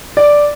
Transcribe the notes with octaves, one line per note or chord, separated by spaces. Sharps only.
D5